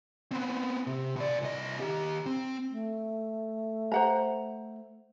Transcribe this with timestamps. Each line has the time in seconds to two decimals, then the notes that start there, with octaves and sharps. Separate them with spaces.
0.31 B3 C4
0.87 C3
1.16 B2 D5
1.42 C2 D#5
1.80 D#3 G4
2.26 C4
2.72 A3
3.92 C5 F#5 A#5